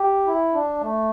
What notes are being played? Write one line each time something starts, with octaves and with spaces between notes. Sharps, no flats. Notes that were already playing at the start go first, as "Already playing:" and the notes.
Already playing: G4
E4
D4
A3